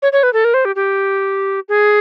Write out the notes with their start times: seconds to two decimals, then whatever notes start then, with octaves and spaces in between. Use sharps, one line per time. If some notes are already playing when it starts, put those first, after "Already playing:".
0.02 C#5
0.13 C#5
0.23 B4
0.33 A4
0.44 A#4
0.54 C5
0.65 G4
0.76 G4
1.69 G#4